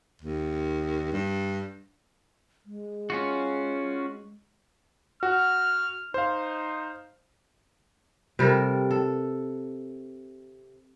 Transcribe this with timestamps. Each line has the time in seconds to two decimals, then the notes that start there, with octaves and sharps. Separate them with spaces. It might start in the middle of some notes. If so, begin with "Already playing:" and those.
0.22 D#2
1.13 G2
2.66 G#3
3.10 C#4 F4 F#4
5.23 F#4 F6
6.14 D#4 C5 F5
8.39 C3 G3 A4 A#4
8.91 A4